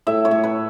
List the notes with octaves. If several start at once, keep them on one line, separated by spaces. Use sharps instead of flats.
A2 E5
C#5
A2
B4